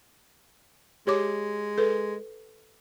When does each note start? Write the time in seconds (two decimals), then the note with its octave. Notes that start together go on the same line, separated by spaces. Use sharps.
1.07 G#3 G4 C#5 D6
1.78 A4 B4